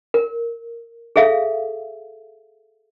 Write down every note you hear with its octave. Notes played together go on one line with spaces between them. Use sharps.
A#4
G#4 A4 E5 F5